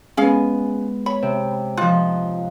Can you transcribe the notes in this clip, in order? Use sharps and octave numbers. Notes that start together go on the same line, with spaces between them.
G#3 B3 C#4 G#4 F5
C#5 B5
C3
F3 D#4 F4 F#6